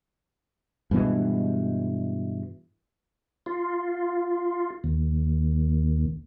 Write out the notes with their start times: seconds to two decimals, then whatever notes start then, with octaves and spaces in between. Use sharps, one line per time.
0.91 G2 B2 E3 G#3
3.46 F4
4.84 D#2